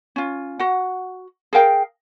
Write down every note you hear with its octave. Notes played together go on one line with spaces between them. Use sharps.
C#4 F4
F#4 F#5
G#4 A#4 F5 G5